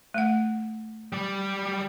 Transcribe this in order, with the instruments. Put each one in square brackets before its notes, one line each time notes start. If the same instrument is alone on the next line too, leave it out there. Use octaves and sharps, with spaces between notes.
[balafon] A3 F#5
[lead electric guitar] G3 D5